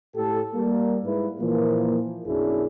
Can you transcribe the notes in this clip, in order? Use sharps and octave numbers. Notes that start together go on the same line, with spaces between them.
A2 G4 A4
G3 A#3
G#2 E4 B4
A#2 E3 F3 A#3
B1 F#2 D4 E4 G#4